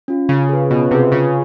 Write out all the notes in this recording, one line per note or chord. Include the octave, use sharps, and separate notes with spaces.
C#4 F4
C#3 F4
G#4 B4
B2 F4
C3 G#4 B4
C#3 F4